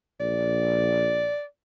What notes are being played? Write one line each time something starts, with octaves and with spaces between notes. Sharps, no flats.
A#1 D5